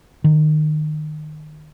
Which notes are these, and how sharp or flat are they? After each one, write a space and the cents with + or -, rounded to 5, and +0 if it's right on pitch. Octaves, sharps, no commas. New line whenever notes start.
D#3 -25